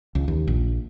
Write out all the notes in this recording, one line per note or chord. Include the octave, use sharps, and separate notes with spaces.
C#2
D#2
A#1